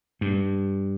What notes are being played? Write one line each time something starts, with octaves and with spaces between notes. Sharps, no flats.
G2